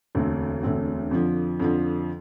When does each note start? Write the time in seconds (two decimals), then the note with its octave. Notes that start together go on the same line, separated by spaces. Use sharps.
0.15 E1 D2 D3 A3 C4
0.63 E1 D2 D3 A3 C4
1.11 F2 D3 F3
1.60 F2 D3 F3